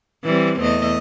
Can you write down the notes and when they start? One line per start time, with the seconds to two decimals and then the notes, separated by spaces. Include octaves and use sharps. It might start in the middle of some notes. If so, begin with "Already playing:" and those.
0.24 E3 G3 C4
0.60 E2 A3 D#5